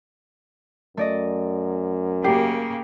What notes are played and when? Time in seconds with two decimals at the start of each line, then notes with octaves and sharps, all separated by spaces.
0.97 F#2 A3 D5 D#5
2.24 C#3 A#3 G4 C7